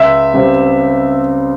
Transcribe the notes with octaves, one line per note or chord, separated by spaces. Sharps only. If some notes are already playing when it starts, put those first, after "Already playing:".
Already playing: C#2 E5
C#3 G3 C4 G4